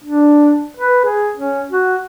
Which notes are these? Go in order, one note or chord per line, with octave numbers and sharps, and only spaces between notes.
D4
B4
G#4
C#4
F#4